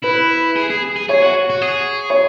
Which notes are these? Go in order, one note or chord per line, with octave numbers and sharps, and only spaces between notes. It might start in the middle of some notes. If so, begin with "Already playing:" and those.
E4 B4
G#4
G#4
G#4
G#4 C#5
F#4
F#4
G#4
C#5